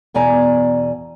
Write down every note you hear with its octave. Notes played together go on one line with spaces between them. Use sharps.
E2 B2 D5 G#5 A#5